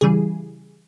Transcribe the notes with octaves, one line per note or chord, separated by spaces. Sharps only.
C#3 E3 G3 G#4